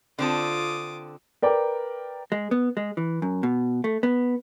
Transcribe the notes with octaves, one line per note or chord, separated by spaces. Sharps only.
D3 C4 F4 A4 D6 D#6
A#4 B4 D5 G5 D6
G#3
B3
G#3
E3
F#2
B2
A3
B3